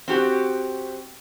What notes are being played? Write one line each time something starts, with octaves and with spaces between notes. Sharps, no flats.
C4 F#4 G4